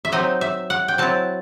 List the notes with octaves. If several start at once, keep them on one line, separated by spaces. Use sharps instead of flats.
E5
F#3 C4 D#4 D#5
E5
F#5
G5
F#3 C4 E4 A5